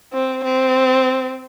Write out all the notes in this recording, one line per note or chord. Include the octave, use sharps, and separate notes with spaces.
C4
C4